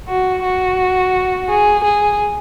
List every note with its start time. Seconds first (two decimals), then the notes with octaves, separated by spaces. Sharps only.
0.09 F#4
0.44 F#4
1.49 G#4
1.84 G#4